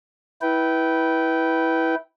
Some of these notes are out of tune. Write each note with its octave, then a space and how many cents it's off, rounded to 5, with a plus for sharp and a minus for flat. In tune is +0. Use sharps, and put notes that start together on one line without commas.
E4 -15 B4 -10 G5 -20